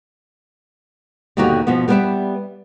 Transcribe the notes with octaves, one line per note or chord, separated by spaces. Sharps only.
D#2 B2 D3 D#4 F#4 G4
B2 F3 B3
G3 B3 A4 B4 D5 E5